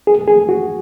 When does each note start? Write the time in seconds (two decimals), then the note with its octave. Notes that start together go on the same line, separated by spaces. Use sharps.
0.07 G#4
0.28 G#4
0.49 F#4